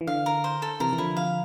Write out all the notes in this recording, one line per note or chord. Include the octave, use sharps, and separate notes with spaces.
E3
D3 F5
A#4
C5
A4
C3 E3 A#4
E3
D3 F3 E4
F5